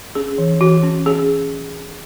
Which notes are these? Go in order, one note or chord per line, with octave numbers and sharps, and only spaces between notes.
C#4 G#4
E3
E3 F#4
C#4
C#4 G#4